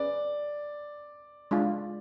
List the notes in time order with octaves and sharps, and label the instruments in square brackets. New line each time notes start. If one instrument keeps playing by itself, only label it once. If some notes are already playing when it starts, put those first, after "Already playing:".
Already playing: [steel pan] C#4 G#4 B4 [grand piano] D5
[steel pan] G#3 D4 F4